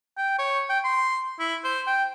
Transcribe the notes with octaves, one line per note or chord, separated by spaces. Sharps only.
G5
C#5
G5
C6
E4
C5
G5